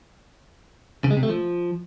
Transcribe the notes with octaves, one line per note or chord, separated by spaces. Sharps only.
C#3
G#3
C3
A3
F3